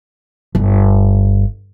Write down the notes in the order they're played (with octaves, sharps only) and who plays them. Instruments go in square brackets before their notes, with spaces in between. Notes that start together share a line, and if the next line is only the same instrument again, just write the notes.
[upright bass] G1